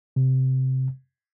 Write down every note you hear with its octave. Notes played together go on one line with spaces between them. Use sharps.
C3